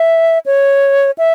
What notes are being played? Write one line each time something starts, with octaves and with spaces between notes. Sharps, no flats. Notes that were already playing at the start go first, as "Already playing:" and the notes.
Already playing: E5
C#5
E5